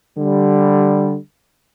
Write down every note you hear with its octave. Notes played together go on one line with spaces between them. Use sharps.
D3 G3